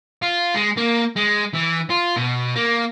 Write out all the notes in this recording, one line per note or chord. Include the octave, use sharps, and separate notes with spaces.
F4
G#3
A#3
G#3
E3
F4
B2
A#3